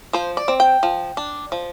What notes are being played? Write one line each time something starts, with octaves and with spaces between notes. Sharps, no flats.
F3 C5
D5
C4
G5
F3
D4
F3